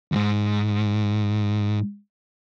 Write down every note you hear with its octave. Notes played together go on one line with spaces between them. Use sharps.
D2 G#2